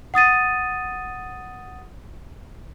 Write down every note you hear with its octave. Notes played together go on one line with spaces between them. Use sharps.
F#5 D#6 A6 D#7